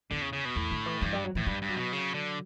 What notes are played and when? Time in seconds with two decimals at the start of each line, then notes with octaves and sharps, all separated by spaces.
0.11 E2 D3
0.21 C#3
0.33 C#3
0.45 B2
0.56 E2 A2
0.71 D3
0.86 E3
1.01 G2 E3
1.13 G3
1.24 F#3
1.35 A2 E3
1.47 G2 G3
1.62 G2
1.69 F#3
1.76 B2
1.93 C#3
2.14 D3